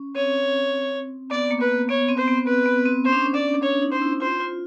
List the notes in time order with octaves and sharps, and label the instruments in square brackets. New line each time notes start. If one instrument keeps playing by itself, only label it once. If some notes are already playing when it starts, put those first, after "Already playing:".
Already playing: [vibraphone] C#4
[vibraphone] C4 [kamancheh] C#5
[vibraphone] B3 [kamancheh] D5
[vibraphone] A#3
[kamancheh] B4
[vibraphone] B3 [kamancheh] C#5
[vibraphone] C4
[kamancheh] C5
[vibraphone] B3
[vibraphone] B3 [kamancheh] B4
[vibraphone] B3
C4
[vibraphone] C#4 [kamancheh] C5
[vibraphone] D4
C#4
[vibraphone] C#4 [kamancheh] D5
[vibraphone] D4 [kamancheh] C#5
[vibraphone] D#4
[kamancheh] C5
[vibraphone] E4
[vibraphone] F4 [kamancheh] C5
[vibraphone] F4